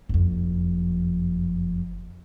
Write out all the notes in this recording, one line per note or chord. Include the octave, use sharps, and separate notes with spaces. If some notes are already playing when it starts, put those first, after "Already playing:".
F#1 F2